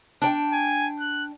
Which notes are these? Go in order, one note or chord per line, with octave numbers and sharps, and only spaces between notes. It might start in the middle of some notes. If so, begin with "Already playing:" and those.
D4 G5
G#5
F#6